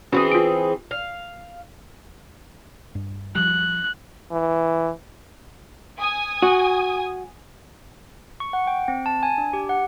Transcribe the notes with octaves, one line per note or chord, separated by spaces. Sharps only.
E3 C4 C#4 F#4 G#4
F4 D7
F5
G2
F3 G3 F#6
E3
G#5 D#6
F#4
C#6
F#5
G5
C4
A5
G#5
D4
G4
F#5